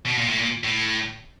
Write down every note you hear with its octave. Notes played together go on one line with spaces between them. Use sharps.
B2
A#2
A2
A#2
A2